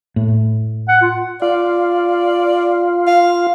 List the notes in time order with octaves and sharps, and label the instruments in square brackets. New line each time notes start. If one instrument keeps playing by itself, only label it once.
[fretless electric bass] A2
[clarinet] F#5
F4
[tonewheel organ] F4 [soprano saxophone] D5
[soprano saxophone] F5